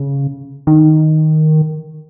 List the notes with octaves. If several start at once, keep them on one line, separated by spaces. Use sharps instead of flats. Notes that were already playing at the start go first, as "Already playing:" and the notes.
Already playing: C#3
D#3